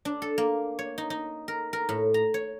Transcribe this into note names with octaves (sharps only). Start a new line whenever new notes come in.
D4
A4
A#3
C#5
D#4
D#4
A#4
A#4
A2
A#5
C#5